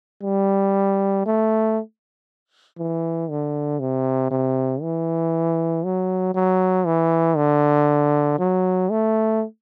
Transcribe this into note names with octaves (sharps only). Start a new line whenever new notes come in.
G3
A3
E3
D3
C3
C3
E3
F#3
F#3
E3
D3
F#3
A3